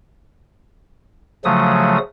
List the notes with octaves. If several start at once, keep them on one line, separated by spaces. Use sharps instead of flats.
C#3 F3 F#3 A3 D#6